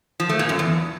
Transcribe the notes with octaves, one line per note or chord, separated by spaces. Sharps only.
F3
A3
A#2
F#2
E2